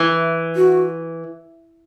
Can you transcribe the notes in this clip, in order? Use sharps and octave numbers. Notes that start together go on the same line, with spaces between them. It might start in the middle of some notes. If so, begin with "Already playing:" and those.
Already playing: E3
F#4